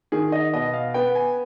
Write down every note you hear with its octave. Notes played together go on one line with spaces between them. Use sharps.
D#3 G#4
D#5
B2 D#5
F5
B3 G5
G#5